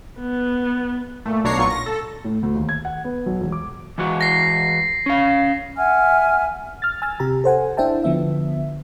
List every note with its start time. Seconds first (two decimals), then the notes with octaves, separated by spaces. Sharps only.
0.19 B3
1.26 A#2 A3
1.44 B1 B2 D4 C#5 A#5 C7
1.57 B1 A#2 F#3 F4 C#6
1.70 A#6
1.86 A4
2.24 A2
2.43 D2
2.55 D#2
2.69 G#6
2.85 F#5
3.04 B3
3.26 B1
3.41 E1
3.52 D6
3.98 E3 G#3 F#4
4.21 A#6 C7
5.06 C#4 F5
5.77 E5 F#5 G#5 F6
6.82 F6 A6
7.02 G#5 E6 F6 A6
7.20 C3 G4 A#5
7.44 A4 C5 F#5 G#5
7.77 D4 E4 C5 E5 G5 A5
8.04 D3 F3 B3 E5